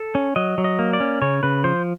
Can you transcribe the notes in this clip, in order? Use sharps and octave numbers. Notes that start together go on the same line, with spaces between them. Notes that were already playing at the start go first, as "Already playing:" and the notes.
Already playing: A4
C#4
F#3 D#5
F#3
D#5
A#3
D5
C#4
C#3 C#5
C#3 B4
F3 C5